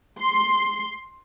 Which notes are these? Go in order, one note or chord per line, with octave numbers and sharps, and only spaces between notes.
C6